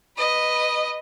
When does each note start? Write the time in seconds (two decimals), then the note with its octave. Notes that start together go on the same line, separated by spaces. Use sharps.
0.17 B4 D#5